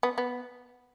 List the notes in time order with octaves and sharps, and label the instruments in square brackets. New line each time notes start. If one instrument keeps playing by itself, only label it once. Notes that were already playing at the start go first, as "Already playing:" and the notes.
[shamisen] B3
B3